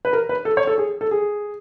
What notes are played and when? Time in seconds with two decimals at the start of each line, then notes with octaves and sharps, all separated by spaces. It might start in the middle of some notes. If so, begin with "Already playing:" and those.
0.05 B4
0.13 A#4
0.29 B4
0.45 A4
0.57 C#5
0.67 A4
0.78 G#4
1.01 A4
1.11 G#4